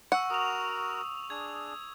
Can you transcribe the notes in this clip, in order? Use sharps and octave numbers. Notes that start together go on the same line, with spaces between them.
F#5 C#6 E6
F#4 A#4 D#6 F7
D4 G#4 G#6